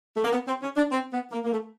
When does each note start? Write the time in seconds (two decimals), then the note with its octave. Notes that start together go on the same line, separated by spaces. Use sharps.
0.16 A3
0.24 A#3
0.33 B3
0.47 C4
0.62 C#4
0.76 D4
0.91 C4
1.12 B3
1.32 A#3
1.44 A#3
1.51 A3